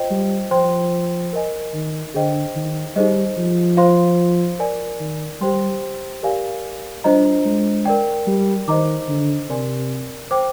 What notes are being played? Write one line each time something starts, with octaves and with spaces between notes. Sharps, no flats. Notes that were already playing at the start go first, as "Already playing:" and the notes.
Already playing: F4 C5 D#5 G5
G3
F3 C5 G5 C6
A#4 D#5 G#5
D#3
D3 G#4 C5 D#5 G5
D#3
G3 D#4 G#4 C5 D#5
F3
F4 C5 F5 C6
A#4 D5 G#5
D#3
G3 G4 C5 G5 C6
G4 A#4 D5 F5 G#5
G3 D4 F4 C5 D#5 A#5
G#3
A#4 D5 G5
G3
D#3 C5 D#5 A#5 D6
D3
C3 A#4 D5 G#5 C6
C5 G5 D6